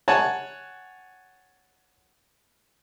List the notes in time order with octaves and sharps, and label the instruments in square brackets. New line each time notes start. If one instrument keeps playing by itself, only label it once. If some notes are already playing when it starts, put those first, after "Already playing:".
[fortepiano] C#5 F#5 G#5 A5